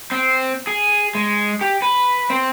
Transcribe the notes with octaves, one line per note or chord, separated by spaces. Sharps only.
C4
G#4
G#3
G4
B4
C4